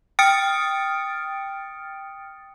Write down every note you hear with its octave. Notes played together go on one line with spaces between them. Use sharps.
G5 D#6 F6 A6 C#7 D7